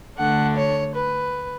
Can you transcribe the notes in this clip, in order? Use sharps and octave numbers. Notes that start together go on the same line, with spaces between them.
D2 D3 A3 D4 F#5
C#5
B4